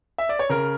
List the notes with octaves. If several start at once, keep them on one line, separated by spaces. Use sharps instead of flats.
E5
D5
C#5
C#3 A#4